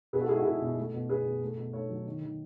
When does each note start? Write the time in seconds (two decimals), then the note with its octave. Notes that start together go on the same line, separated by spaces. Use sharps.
0.13 B2 G#4 B4
0.21 F#4 A4
0.28 G#3 E4 G#4
0.37 F#4
0.45 B2 E4 G#4
0.61 B2
0.77 A3
0.94 B2
1.09 B2 G#4 B4
1.26 B2
1.41 A3
1.57 B2
1.73 A3 A4 C#5
1.90 F#3
2.06 D#3
2.22 D#3